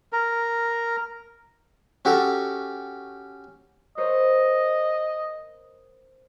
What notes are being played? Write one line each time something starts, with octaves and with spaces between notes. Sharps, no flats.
A#4
C#4 F#4 G4 A4 A#4
A#4 C5 C#5 D#5